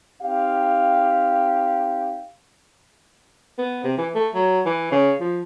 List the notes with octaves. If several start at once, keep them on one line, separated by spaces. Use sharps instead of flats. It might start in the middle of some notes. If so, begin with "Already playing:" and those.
C4 D#4 G4 F5
B3
C3
E3
A3
F#3
E3
C#3
F3